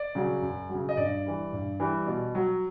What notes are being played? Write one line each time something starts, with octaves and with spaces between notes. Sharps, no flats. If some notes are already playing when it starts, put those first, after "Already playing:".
Already playing: D5
C#3 F#3
F#2
C#3 F#3
D#5
G2 D5
E3 G3
G2
E3 G3
B2
F#3